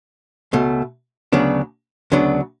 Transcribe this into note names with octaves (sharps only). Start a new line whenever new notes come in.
C#2 B2 A3
D2 C#3 F#3 B3 D4
D2 C#3 F#3 B3 D4